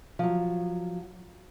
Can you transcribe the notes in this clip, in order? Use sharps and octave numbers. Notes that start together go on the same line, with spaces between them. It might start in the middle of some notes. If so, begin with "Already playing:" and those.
F3 F#3